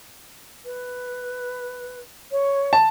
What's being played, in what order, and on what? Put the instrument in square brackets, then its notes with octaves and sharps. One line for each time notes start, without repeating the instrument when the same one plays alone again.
[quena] B4
C#5
[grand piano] A5